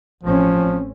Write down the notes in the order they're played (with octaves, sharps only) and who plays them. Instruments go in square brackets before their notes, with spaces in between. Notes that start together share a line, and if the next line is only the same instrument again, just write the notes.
[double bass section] A1 C4 C#4 [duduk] F3